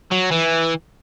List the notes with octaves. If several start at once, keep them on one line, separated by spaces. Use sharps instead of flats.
F#3
E3